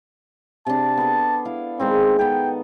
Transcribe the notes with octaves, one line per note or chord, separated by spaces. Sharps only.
C3 D4 A5
B3 A4
E4 F5
D#3 G#3 C4 D#4
B3 A4 G5